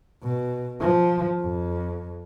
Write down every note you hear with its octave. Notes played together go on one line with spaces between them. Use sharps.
B2
F3
F2